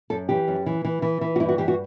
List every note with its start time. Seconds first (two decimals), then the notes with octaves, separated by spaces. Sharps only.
0.10 F#2 A4
0.29 E3 G4
0.48 F#2
0.66 E3
0.85 E3
1.02 E3
1.21 E3
1.36 F#4
1.40 G2 E4
1.49 F#4
1.58 E3 G4
1.68 F#4